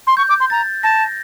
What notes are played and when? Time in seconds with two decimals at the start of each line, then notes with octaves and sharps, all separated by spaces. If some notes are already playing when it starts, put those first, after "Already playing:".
0.07 C6
0.17 C#6 G6
0.29 D6
0.40 C6
0.50 A#5 A6
0.83 A5 A#6